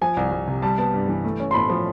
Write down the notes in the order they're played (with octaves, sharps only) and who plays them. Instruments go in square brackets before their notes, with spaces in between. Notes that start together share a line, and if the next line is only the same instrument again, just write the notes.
[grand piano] F3 [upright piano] G#5
[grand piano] C2
C2
C3
[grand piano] G3 [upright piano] A5
[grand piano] B3 [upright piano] A5
[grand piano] G2
E3
A3
C#4
[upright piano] C6
[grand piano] A2 [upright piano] B5
[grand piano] F3